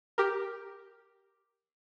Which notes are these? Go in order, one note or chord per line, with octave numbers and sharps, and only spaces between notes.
G4 A#4